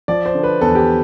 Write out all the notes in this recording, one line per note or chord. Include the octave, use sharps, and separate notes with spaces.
F3 D5
C5
D3
B4
E2 A4
G4